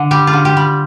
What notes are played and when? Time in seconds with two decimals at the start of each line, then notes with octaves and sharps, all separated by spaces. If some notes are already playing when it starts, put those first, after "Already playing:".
Already playing: D3
0.11 G3 G4
0.27 F4
0.33 D3
0.45 G4
0.57 G3